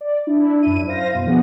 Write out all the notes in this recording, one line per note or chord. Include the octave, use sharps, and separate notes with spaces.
D5
D4 E4
F#2 E4 D#7
C5 F5 A#6
F#2 B2
D3 F3 B3 G#4 F#5